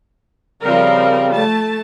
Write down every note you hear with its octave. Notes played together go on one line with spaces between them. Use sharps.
C#3 F3 G3 C4 A#4
A3 A5